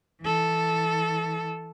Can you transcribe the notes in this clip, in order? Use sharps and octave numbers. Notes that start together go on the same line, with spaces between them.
E3 A4